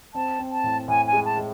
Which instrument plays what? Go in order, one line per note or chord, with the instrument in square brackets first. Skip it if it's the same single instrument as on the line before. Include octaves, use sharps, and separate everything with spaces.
[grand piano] C4 [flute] A5
[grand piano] C4
[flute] A5
[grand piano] A2
[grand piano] A2 [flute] G#5
[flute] G#5
[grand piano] G#3
[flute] A5
[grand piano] G#3